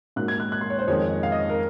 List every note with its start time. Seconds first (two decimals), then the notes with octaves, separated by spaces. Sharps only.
0.16 G#2 F#3 A#3 F#6
0.28 G#6
0.40 F#6
0.52 F#6
0.61 C6
0.70 C#5
0.79 C5
0.87 F2 D#3 G#3 C#5
1.23 F5
1.32 D#5
1.50 A#4